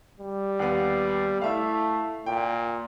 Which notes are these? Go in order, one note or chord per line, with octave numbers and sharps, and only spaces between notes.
G3
D#2 B3
A3 E4 E5 F5
A#2 G5